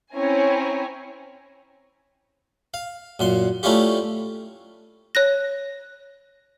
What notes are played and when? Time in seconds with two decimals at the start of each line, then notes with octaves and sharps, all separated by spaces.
0.15 C4 C#4 E4 C#5 G#5 A#5
2.74 F5
3.19 F#2 A#2 C6
3.63 A3 C#4 D4 E4 F4 G4
5.15 C#5 F#6 A#6